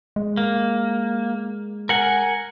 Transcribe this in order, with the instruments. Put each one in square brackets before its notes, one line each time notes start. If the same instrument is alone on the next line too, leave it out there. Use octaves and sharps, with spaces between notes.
[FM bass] G#3
[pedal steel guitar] A#3
A#4 F#5 G#5